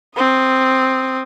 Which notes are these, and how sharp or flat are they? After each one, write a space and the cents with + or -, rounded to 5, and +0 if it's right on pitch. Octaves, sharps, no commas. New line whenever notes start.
C4 +0 D#6 +0